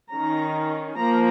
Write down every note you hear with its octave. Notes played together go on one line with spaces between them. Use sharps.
D#3 C#4 A#5
F3 A#3 A#5